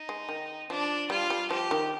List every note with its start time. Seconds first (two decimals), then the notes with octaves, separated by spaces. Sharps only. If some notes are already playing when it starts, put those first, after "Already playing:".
Already playing: D#4
0.09 G#3
0.29 D#3
0.69 F3 D4
1.10 G3 F4
1.30 G3
1.50 F3 G4
1.71 D#3